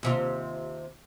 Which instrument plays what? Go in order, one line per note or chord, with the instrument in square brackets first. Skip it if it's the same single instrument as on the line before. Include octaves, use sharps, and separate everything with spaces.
[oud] D#2 C3 F4